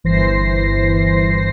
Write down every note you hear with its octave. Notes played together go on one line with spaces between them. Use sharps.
G1 E3 C5 A#6 C7